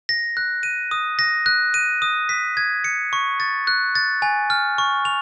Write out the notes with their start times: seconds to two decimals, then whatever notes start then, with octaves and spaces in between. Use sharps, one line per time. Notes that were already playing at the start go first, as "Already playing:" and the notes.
0.09 A#6
0.37 F#6
0.63 D#7
0.91 D#6
1.19 A#6
1.46 F#6
1.74 D#7
2.02 D#6
2.29 B6
2.57 G#6
2.84 C#7
3.13 C#6
3.40 A6
3.67 F#6
3.95 A6
4.22 G#5
4.50 F6
4.78 C#6
5.05 F7